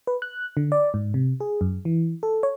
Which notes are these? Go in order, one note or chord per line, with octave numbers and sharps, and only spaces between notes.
B4
F#6
D3
D5
G#2
C3
G#4
F#2
E3
A4
C#5